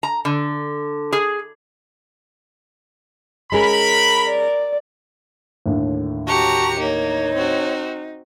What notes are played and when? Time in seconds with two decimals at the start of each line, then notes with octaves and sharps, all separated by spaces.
0.03 A#5
0.25 D3
1.13 G#4
3.52 G#3 C#4 G#4 A#4 B5
4.28 D5
5.66 D#2 A2 D3
6.27 F#4 G4 A5 A#5 C#6 C#7
6.80 A#3 D#4 C#5
7.34 C4 F#4